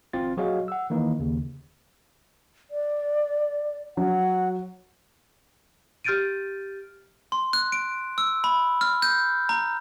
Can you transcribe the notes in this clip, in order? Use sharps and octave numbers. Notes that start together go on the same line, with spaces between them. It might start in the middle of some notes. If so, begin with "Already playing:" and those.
G#1 C4 F4 A6
F#3 F#4 G#4 C#5 D#5 F5
F#5 E6
D#3 E3 A#3 D#4 B4
D#2 C#3
D5
F#3 F#5
G4 F6 G6 A6 D7 D#7
C6
F#6
D7
E6
B5
F6
G6
A#5